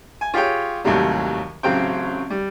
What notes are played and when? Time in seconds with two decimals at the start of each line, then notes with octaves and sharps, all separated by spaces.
0.21 G#5
0.34 F4 G4 G#4 C#5 G5
0.84 D#2 A2 C3 F#3 G3
1.63 A1 C#3 F#3 C4 G5
2.30 G3